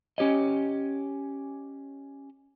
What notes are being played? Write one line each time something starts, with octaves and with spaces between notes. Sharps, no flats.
C#4 G4 C#5 D#5